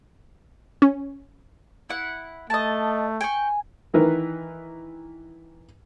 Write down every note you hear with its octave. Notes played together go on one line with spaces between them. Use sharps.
C#4
E4 F#5
A3 D#5 A5
G5 G#5 C#6
D#3 E3 A#4 B4